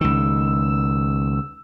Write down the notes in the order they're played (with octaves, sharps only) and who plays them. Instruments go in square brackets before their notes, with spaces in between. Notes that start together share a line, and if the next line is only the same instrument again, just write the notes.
[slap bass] C#2 D#3 [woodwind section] E6